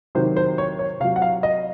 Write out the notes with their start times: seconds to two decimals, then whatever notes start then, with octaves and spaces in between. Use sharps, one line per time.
0.15 C3 D#3 F#3 C5
0.37 C5
0.58 C#5
0.79 C#5
1.00 C3 F5
1.04 F#3
1.16 F#5
1.22 F5
1.43 D#5